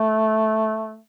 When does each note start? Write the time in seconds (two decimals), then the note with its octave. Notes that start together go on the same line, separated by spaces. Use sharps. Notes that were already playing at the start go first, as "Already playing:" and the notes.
Already playing: A3